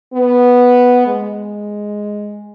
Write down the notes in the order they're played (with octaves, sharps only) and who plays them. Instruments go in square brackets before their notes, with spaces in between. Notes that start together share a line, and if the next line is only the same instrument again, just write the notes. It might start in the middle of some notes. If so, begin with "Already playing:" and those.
[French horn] B3
G#3